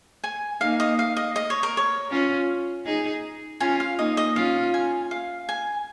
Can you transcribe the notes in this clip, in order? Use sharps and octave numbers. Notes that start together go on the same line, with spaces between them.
G#5
A#3 D#4 F5
D#5
F5
D#5
D#5
C#5
A#4
C#5
C#4 F4
D#4 G#4
C#4 F4 G#5
F5
A#3 D#4 D#5
D#5
C#4 F4 F5
G#5
F5
G#5